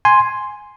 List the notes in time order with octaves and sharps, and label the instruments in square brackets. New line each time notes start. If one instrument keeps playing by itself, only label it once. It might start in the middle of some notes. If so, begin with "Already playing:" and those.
[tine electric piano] G#5 C6